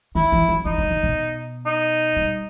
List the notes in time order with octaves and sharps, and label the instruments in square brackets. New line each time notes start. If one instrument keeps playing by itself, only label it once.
[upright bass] D#3 [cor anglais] E4
[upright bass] E3
F#3
[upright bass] E3 [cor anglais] D#4
[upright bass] F#3
D#3
B2
[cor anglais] D#4
[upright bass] G3